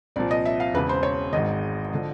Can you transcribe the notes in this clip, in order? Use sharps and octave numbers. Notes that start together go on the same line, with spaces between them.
C2 A#2 F3 D5
D#5
E5
F5
E1 E2 C#3 B4
C5
C#5
G#1 G#2 D#3 D#5
D3 F3